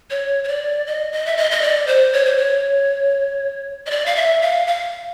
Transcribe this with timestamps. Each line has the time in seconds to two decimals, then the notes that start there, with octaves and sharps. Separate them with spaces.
0.10 C#5
0.44 C#5
0.48 D5
0.87 D#5
1.12 D#5
1.26 E5
1.37 D#5
1.51 D#5
1.62 D5
1.87 C5
2.13 C#5
2.25 C5
2.38 C#5
3.86 D#5
3.91 D5
4.06 F5
4.16 E5
4.42 F5
4.67 F5